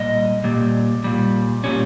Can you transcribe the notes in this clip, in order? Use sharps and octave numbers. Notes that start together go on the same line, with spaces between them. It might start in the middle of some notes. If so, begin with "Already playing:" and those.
Already playing: A#2 G3 D#5
A#2 G3
A#2 G3
A#2 G3 C#4